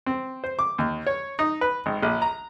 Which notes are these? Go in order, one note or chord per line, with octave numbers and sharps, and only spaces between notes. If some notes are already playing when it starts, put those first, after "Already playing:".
C4
C5
D6
D#2
C#5
D#4
B4
G#1
A#1
A#5